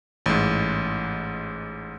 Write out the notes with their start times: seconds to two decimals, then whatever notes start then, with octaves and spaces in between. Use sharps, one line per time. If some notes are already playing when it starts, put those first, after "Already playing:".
0.26 A1 G#2